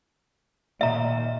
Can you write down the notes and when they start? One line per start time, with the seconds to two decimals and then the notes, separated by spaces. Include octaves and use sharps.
0.81 D#2 A#2 D#5 E5 A#5